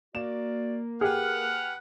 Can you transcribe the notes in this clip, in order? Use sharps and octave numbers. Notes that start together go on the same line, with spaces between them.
A#3 F#4 D5 E7
G4 G#4 B4 F#5 F6